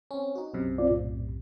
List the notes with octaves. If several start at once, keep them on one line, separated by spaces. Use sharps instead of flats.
C4 C#4
D#4 F#4
B1 F#2 C3
C4 F4 D5
A2